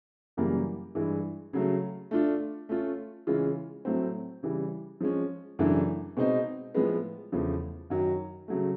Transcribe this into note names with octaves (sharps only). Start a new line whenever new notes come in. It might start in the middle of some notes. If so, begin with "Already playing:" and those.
F#2 C#3 E3 G3 A#3
G2 E3 G#3
C#3 F#3 A3
A3 D4 F4
A3 C#4 F4
C#3 E3 G#3 C#4 F4
A2 F#3 A3 C4
C#3 E3 G3
F3 G#3 C#4
F#2 C#3 E3 A3 D4
B2 G#3 C4 D#4
A2 F3 G#3 B3
E2 C#3 F3 A3
F#2 D#3 F#3
C#3 F#3 A3